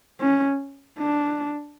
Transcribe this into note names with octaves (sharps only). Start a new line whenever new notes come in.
C#4
D4